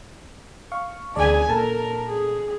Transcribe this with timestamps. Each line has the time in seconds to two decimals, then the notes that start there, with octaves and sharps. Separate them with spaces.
0.72 F5 C#6
1.15 D2 G#4 D5 G#5 A5
1.49 A#2 A4 A#4 A5
2.08 G#4